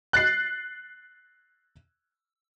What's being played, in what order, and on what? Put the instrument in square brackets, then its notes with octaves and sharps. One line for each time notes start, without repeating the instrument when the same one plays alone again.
[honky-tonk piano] F#6 A6 C7